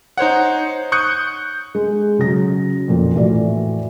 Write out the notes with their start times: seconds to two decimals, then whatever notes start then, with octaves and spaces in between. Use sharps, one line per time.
0.18 D#4 C5 C#5 F#5
0.92 C#6 D#6 F#6 G6 C#7
1.75 G#3
2.19 C#3 F#3 A#6
2.88 F2 A#2 F3
3.14 A2 E3 F#4 D5